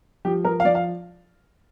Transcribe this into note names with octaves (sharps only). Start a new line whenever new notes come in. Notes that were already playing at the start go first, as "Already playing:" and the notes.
F3 G4
F3 A#4
F5
F3 D5
F5